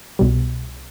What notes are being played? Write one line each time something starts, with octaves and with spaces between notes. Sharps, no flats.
C2 B2 G3